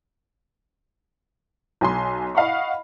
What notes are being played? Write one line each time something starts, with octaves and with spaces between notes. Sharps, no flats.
B1 G#5 C6
D#5 F5 F#5 B5 C#6